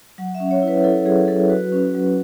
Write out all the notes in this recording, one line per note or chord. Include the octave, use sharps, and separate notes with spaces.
F#3 F#5
E5
C#4
C#5
E4
B4
E4 A4
F#3 G#4
F#3 A4
F#4 B4
C#4
F#3